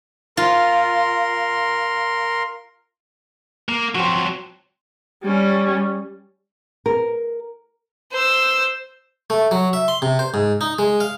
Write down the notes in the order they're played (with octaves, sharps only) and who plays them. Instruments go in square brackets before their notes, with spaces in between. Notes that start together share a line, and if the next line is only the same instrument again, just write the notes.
[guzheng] F4 [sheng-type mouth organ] A#4 C6
[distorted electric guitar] A#3
[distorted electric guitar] F3 F#3 [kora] C4 F#4
[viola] G3 C#4
[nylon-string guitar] A#4
[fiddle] C5 E6
[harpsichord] A3
F#3
E5
C6
C3
C5
G#2
D#4
G#3
F5